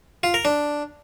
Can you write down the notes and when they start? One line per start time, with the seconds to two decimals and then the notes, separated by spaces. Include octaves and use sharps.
0.23 F4
0.34 A#4
0.45 D4